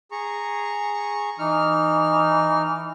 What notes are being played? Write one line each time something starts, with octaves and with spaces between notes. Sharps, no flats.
G#4 A#5 C#6
E3 D#4 F6